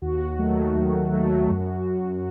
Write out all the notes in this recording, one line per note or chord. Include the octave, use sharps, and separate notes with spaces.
D#2 F#4
D#3 F#3 A3
D#2
D#3 F#3 A3
F#2